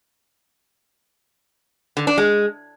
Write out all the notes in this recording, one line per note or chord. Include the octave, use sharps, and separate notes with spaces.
D3
D4
G#3